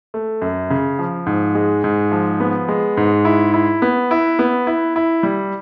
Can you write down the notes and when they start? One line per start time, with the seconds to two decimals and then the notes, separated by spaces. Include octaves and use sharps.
0.14 A3
0.42 F#2
0.70 C#3
0.99 F3
1.26 G#2
1.55 G#3
1.84 G#2
2.12 F3
2.40 B3
2.68 G#3
2.97 G#2
3.25 E4
3.54 E4
3.82 B3
4.11 E4
4.39 B3
4.67 E4
4.96 E4
5.23 G3